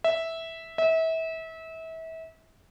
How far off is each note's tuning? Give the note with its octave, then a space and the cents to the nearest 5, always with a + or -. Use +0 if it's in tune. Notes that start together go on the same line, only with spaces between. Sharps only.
E5 -10
E5 -30